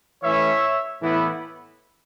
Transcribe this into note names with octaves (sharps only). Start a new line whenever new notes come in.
E3 A3 C#4 E4 C#5 E5
A2 E3 B3 E4